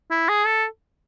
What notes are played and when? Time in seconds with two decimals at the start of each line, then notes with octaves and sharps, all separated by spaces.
0.11 E4
0.29 G#4
0.46 A4